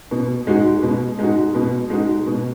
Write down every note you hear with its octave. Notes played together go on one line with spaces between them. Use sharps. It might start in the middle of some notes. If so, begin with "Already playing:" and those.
B2
G#3 D#4 F#4
B2
G#3 D#4 F#4
B2
G#3 D#4 F#4
B2